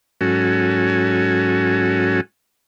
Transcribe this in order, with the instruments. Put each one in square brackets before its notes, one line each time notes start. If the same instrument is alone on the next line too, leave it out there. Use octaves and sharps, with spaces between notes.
[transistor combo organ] G#2 F#3 C#4 F#4 A4 G#5